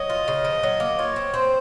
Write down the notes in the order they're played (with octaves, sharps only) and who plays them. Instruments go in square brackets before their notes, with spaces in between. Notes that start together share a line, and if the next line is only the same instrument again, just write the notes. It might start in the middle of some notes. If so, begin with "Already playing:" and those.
Already playing: [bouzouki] F#3 [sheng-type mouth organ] D#5
[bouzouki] F4
C#3
F3
F#3
A#3
[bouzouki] F4 [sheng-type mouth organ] C#5
[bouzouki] C4
[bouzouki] C4 [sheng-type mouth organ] C5